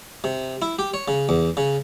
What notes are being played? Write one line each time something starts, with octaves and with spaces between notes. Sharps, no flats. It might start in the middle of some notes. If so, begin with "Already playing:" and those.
C3
E4
G4
C#5
C#3
E2
C#3